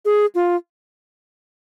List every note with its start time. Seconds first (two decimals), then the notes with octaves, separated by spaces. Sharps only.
0.05 G#4
0.35 F4